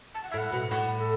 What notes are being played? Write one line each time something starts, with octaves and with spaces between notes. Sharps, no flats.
A5
F#5
E5
A2 F#5
B2
A2 F#5
A4